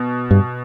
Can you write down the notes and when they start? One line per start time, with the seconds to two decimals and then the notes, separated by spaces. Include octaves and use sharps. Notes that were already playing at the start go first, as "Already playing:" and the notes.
Already playing: B2
0.31 G2